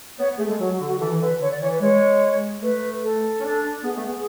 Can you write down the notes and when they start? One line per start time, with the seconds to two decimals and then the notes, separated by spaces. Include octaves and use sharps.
0.19 B3 C#5
0.29 B3
0.38 A3 G#4
0.46 G#3 A4
0.60 F#3 F#4
0.73 F#4
0.80 D3
0.87 F#4
1.00 E3 A4
1.11 E3
1.21 D3 B4
1.40 D3 C#5
1.51 D5
1.61 E3 C#5
1.72 B4
1.81 G#3 C#5
2.62 A3 B4
3.04 A4
3.40 C#4
3.44 D4
3.84 B3 G#4
3.96 A3
4.05 B3